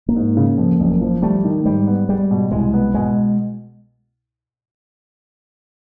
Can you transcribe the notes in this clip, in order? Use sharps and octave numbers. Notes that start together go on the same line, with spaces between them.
A#3
G#2
C#3
F2
F#1
F3
G3 A3
D#3
G#2 G3
B3
G3 G#3
B2
C2 G#3
B3
B2 G#3